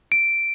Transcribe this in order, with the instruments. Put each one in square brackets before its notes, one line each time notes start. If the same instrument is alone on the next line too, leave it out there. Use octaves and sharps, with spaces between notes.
[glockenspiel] D7